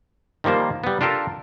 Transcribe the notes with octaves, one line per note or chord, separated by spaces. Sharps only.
D#3 F3 G3 A#3 C5
G3 B3
D4 F4 G4 A4 A#4